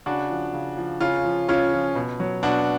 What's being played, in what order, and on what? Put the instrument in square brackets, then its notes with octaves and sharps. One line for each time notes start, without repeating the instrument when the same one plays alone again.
[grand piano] C#3 D4 F#4
F3
C#3
F3
C#3 C#4 F4
F3
C#3 C#4 F4
F3
B2
F#3
B2 D4 F#4